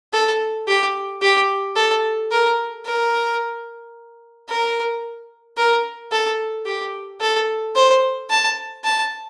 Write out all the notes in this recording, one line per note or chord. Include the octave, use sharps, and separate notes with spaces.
A4
G4
G4
A4
A#4
A#4
A#4
A#4
A4
G4
A4
C5
A5
A5